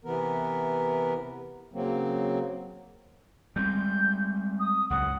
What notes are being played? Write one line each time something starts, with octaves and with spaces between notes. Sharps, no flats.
C3 E3 B3 A#4
C#3 F#3 A#3 C4
G3 G#3 C4 G6
D#6
C#2 F#2 G#3 F#5